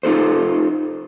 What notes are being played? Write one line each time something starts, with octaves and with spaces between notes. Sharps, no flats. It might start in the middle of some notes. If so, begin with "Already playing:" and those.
D#4 F4 A4 C5